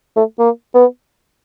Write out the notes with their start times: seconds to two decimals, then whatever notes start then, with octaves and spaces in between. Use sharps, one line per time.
0.16 A3
0.39 A#3
0.74 B3